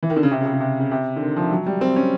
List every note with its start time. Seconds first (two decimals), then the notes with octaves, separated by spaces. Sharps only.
0.03 E3
0.10 D#3
0.16 D3
0.23 C#3
0.31 C3
0.40 C#3
0.46 C3
0.53 C#3
0.60 C3
0.80 C#3
0.91 C3
1.16 D3
1.20 D#3
1.36 F3
1.51 F#3
1.67 G3
1.81 C4
1.96 C#4